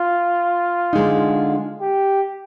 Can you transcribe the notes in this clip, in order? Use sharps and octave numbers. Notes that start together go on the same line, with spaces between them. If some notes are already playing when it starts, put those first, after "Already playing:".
Already playing: F4
D3 G#3 D#4
G4